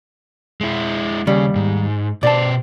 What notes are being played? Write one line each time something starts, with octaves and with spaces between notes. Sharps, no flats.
G#3 E4
D#2 C#3 G3
G#2
B2 A4 C5 D5 A5